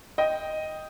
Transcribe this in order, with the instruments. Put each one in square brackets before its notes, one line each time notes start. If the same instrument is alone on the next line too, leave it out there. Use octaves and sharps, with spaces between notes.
[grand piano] D#5 G5